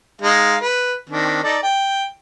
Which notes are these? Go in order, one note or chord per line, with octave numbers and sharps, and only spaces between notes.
G#3 D#4 F5
B4
D#3 C4 D4
D#4 A4 D5
G5